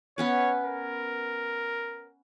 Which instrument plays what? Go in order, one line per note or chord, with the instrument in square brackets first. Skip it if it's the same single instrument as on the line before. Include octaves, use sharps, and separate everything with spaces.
[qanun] B3 C#4 B4 [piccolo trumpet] C#5
[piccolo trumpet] A#4